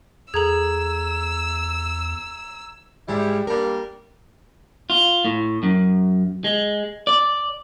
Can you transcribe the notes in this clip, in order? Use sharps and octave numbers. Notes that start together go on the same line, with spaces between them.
E2 G#4 A4 A#5 E6 G#6
G#2 G3 G#3 E4
G3 A#3 D4 A#4
F4
A2
F#2
G#3
D5